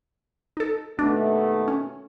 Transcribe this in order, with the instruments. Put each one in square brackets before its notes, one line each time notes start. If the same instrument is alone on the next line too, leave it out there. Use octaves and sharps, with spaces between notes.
[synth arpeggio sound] D#4 A4
[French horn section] D#2 B2 A3 [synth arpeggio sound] D4
[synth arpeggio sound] C#4